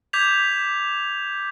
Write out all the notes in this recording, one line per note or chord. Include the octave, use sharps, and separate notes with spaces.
D6 G6 G#6 B6 F7